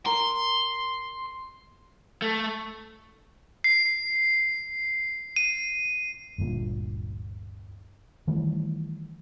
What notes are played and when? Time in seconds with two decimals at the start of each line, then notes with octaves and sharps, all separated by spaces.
0.06 A#4 C6
2.22 A3
3.64 C7
5.36 D#7
6.38 G1 D2 G2 A#2
8.28 D#3 E3 G3 A3